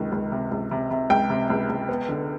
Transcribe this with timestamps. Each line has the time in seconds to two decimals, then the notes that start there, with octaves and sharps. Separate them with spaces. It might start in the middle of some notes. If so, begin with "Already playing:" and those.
Already playing: C#2 C3 D#3
0.12 C#2
0.32 C3
0.51 C#2
0.71 C3
0.91 C3
1.10 C#2 G5
1.30 C3
1.50 C#2
1.69 C#2
1.89 B3
2.09 D3